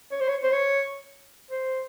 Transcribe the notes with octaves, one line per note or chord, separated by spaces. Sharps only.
C#5
C5
C#5
C5
C#5
C5